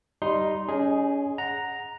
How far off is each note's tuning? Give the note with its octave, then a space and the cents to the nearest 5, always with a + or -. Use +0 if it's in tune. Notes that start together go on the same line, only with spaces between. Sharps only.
G3 -10 D#4 +0 C6 +0
C#4 +30 G#4 +0 D#5 +0
F#5 -5 A#5 +0